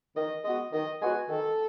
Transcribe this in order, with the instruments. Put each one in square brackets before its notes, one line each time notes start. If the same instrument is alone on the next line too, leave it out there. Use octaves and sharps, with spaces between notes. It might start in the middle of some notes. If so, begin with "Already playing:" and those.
[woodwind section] D#3 [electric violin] D#5
[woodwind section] G#3 B3 F#4 [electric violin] D#5
[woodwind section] D#3 [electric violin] D#5
[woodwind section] G#3 B3 F#4 [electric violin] G#5
[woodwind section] D#3 [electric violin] A4